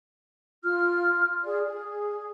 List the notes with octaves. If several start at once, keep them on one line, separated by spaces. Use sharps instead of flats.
F4 F6
G#4 D5
G#4